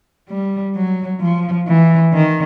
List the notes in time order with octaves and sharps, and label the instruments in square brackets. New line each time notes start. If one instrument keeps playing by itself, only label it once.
[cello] G3
F#3
F3
E3
D#3